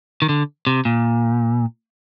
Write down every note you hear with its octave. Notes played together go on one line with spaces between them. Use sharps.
D#3
D3
C3
A#2